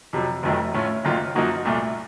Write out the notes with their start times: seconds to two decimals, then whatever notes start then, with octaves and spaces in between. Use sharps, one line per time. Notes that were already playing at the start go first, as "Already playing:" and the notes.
0.13 F2 C3 F#3
0.43 F1 F2 D#3 F#3 A3
0.74 A2 A3 C#4 F4
1.04 F#1 F#2 D#3 A#3 F4
1.35 F#2 F3 A#3 D#4 F#4
1.65 C2 A#2 A3